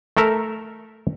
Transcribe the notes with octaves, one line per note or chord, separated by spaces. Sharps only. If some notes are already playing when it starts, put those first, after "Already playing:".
A3 A4 A#4 E5